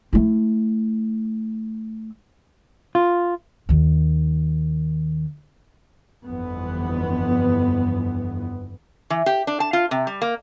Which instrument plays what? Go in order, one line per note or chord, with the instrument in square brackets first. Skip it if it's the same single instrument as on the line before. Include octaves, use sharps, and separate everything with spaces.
[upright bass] A3 E4
[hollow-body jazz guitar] F4
[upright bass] D#2 D#3
[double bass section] G1 F2 E3 B3
[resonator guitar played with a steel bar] E3
G4
D4
A5
F4
C3
G3
A#3